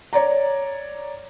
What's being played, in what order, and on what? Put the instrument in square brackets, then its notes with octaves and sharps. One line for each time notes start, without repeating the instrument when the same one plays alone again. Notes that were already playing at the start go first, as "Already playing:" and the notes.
[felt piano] C#5 D5 A#5